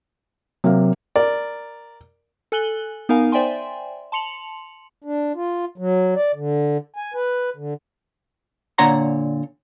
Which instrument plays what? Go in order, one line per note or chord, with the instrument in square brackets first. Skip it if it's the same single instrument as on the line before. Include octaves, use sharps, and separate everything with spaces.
[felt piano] C3 A#3 F5 [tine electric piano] F#3
[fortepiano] A#4 D5
[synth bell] A4 G#5 F#6 F#7 G7
B3 D#4 A#4 F5 G#5
C5 D5 E5 G5 G#5 C6
A5 C6 C#7 F7 F#7
[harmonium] D4
F4
F#3
D5
D3
G#5
B4
D3
[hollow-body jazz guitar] A#2 D3 C#5 F#5 A#5 C6